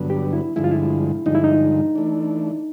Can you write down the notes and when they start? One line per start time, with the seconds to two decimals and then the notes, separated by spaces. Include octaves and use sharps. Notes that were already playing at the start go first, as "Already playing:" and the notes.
Already playing: G2 D3 F#3 B3
0.10 G4
0.33 E4
0.56 G2 D3 F3 G#3 E4
0.64 F4
0.71 E4
1.26 G2 D3 F3 G#3 D#4
1.35 E4
1.44 D#4
1.95 E3 A3 D4